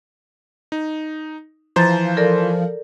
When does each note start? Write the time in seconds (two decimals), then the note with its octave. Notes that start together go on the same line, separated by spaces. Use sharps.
0.72 D#4
1.76 E3 F3 C5 A#5 A6
2.17 A4 A#4 D5